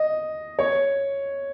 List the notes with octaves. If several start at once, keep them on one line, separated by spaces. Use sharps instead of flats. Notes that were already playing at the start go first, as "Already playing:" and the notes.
Already playing: D#5
C#5